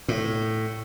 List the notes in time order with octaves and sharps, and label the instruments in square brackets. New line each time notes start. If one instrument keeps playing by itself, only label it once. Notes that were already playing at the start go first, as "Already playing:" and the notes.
[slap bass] A2